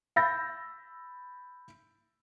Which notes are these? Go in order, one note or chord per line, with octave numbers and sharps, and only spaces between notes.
B5 E6 G6 A6 A#6